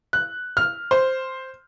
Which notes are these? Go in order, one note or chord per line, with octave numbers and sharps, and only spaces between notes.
F#6
F6
C5